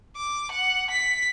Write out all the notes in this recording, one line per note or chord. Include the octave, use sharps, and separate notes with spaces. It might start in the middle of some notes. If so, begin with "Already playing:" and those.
D6
F#5
B6